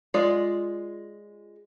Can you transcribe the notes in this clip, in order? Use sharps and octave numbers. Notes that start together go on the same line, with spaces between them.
G#3 F4 D5